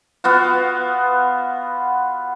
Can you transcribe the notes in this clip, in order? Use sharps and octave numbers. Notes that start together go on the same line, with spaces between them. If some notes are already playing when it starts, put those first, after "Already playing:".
B3 F4 F#4